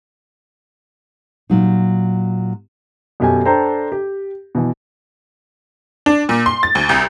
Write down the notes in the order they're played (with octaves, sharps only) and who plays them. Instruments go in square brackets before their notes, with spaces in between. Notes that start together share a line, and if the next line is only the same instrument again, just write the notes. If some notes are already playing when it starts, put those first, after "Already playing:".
[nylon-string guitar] A#2 F#3 D#4
[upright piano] F#2 B2 G4 A4 G#5
D4 A4 C5 G5 A#5
G4
B2 E3
[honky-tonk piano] D4
A#2
C6
A6
D2
C2